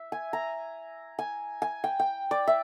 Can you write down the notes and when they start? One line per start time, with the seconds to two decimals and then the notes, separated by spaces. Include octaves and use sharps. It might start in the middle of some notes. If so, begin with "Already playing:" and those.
Already playing: E5
0.12 G#5
0.33 A#5
1.19 G#5
1.62 G#5
1.84 G5
1.99 G5
2.31 D5
2.47 E5